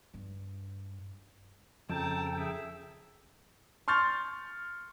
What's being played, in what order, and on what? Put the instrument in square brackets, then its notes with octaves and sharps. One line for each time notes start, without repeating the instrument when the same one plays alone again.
[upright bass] G2
[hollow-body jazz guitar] F2 [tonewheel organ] C#3 A4 G5 [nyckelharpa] A5 A#5
[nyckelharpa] G#4 E5
[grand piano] C6 C#6 F6 G6 A6 F7